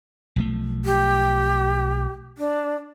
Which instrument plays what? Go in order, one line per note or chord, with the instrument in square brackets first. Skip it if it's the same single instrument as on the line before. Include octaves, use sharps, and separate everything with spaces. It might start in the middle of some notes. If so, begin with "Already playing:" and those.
[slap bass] B1 F3 A3
[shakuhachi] G4
D4